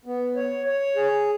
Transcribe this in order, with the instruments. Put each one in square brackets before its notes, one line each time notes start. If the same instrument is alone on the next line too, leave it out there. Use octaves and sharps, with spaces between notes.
[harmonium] B3
C#5
C#5
G#4